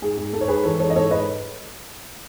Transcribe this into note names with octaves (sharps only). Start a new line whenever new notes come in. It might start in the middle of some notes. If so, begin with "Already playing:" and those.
G#2 G#4
G#2 G#4
G#2 A4
C#5
G#2 G#4 B4
E3 A4 C#5
G#2 A4 C#5
D#5
G#2 A4 C#5
G#3 B4 D#5